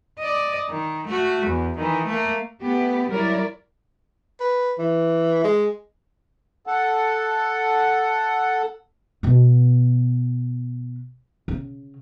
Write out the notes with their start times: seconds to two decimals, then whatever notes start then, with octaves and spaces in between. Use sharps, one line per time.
0.19 D5 D#5
0.69 D#3
1.07 A3 F#4
1.46 E2
1.77 D#3 E3
2.06 A3 A#3
2.61 A3 B3 G4
3.09 F#3 G3 E4 A#4 C#5 D5
4.40 B4
4.78 E3
5.44 G#3
6.67 A4 F#5
9.23 B2 B3
11.48 C#3